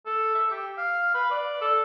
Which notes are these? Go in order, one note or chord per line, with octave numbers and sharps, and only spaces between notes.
A4
E5
G4
F5
B4
D5
A4